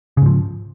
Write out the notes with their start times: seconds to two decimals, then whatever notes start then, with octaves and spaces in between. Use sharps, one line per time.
0.17 C#3
0.22 G#2
0.26 F3